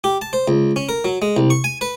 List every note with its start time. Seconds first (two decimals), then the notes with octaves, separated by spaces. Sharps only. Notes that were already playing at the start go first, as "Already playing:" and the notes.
0.04 G4
0.21 A5
0.33 C5
0.48 C#2
0.76 C#4
0.89 A#4
1.05 F#3
1.22 G#3
1.37 C2
1.50 C#6
1.64 G#5
1.81 B4